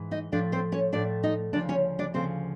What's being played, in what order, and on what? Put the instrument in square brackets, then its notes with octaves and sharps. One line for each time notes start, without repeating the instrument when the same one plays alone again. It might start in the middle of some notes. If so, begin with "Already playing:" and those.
Already playing: [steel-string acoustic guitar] G#2 E3
D#4 D#5
A2 F3 A3 D4 D5
C4 C5
C#4 C#5
A2 F3 A3 D4 D5
D#4 D#5
D2 C#3 F3 D4 D5
C#4 C#5
D4 D5
D2 C#3 F3 C4 C5